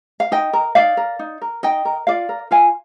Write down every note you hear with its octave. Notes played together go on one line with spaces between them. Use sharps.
F5
D#4 D#5 G5
A#4
D#4 D5 F5
A#4
D#4
A#4
D#4 D#5 G5
A#4
F4 D5 F5
A#4
F4 F5 G#5